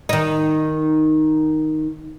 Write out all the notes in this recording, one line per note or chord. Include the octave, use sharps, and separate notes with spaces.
D#3 D#4